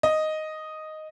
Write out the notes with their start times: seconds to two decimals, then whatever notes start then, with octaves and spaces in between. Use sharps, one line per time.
0.03 D#5